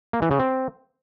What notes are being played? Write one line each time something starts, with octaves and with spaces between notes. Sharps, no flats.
A#3
E3
C#3
C4